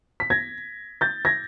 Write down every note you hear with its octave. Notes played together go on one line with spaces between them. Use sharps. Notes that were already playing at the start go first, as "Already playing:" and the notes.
B6
G#6 A#6
G6 A6
G#6 A#6